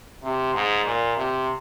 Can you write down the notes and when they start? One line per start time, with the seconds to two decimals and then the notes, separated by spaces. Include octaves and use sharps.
0.23 C3
0.54 G#2
0.85 A#2
1.16 C3